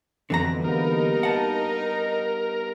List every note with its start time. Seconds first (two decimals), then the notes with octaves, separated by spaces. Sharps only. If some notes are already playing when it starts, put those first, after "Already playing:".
0.30 F2 B2 D3 E3 A#5
0.64 G2 A#3 B3 D#4 A#4
1.23 F#5 A5